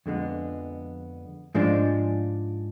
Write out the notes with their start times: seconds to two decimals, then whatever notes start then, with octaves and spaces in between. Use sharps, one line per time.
0.06 F2 D3 G#3 B3
1.55 G#2 F3 G#3 D4